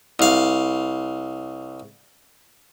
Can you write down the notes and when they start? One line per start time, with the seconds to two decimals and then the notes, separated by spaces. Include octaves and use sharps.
0.19 C2 F5